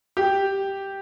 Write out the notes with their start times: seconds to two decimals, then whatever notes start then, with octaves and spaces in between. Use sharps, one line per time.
0.17 G4